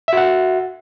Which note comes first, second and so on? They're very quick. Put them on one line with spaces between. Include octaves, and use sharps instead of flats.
E5 F#4 F#5